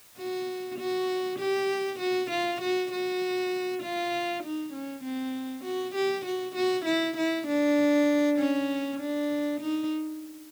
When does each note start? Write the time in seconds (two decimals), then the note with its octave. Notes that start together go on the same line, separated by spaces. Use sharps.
0.18 F#4
0.79 F#4
1.39 G4
2.00 F#4
2.30 F4
2.61 F#4
2.92 F#4
3.83 F4
4.43 D#4
4.73 C#4
5.04 C4
5.64 F#4
5.95 G4
6.26 F#4
6.55 F#4
6.86 E4
7.17 E4
7.47 D4
8.39 C#4
9.00 D4
9.60 D#4